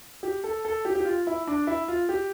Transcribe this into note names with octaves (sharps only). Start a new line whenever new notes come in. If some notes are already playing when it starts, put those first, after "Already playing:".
G4
A4
A4
G4
G4
F4
E4
D4
E4
F4
G4